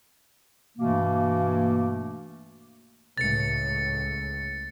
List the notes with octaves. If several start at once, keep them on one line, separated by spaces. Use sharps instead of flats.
G2 B2 E3 A3 A#3
C#2 A2 A6 C#7